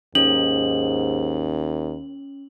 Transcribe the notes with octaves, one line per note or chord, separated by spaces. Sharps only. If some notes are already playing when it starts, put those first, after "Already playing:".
D#2 G#2 C#4 F#7